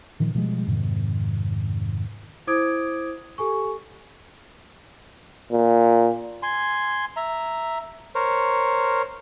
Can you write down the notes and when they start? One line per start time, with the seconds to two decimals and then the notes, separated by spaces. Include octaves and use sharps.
0.20 A#2 D#3 F3
0.35 B2 F3 G3 G#3
0.67 F2 G#2 C3 D#3
2.47 E4 C5 D6 D#6 G#6 D7
3.38 G4 A4 G#5 C#6
5.52 A#2
6.43 G#5 C6
7.17 E5 A#5
8.15 A#4 C5 C#5